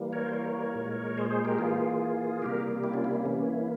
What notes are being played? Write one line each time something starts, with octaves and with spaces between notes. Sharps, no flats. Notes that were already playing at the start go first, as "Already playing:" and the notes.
Already playing: E3 G3 A#3
A#4 C#5
C5
A#4 C#5
A#2 G#3
G#4 C5
G#4 C5
G4 A#4
E3 A#3 F4 G#4
C3 G3 A#3 G4 A#4
E4 G4
C#4 F4
E4
E4
E3 A#3 C#4
E4